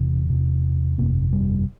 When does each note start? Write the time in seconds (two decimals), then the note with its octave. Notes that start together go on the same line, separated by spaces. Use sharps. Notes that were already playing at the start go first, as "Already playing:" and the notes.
Already playing: E1 E2 C3
0.30 E1 E2 C3
0.97 G1 F2 C3 A#3
1.33 G3